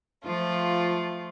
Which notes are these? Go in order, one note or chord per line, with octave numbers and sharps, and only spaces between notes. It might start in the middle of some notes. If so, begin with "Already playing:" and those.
F3 A3 F4